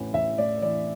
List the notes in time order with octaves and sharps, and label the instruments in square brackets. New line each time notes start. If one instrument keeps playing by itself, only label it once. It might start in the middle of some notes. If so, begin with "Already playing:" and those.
Already playing: [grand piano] A1 A2 E3
A1 E5
A2 D5
E3 D5